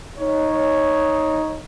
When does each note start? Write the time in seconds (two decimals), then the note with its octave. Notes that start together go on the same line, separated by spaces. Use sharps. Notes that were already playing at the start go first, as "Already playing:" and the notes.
0.19 D#4 C#5